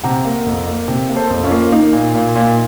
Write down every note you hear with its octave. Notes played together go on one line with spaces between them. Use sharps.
C3 F#5 A#5
A#3
F2
A#3
C3
A#3
A4 C5
F2
C#4 F4
A#3
A#3 D#4
A#2
A#2
A#2